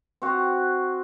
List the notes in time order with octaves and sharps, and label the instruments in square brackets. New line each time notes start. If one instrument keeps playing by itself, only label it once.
[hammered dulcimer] C4 F#4 F5